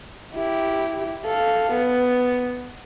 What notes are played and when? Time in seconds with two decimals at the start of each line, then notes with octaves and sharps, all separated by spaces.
0.35 E4 G4
1.25 A4 F5
1.72 B3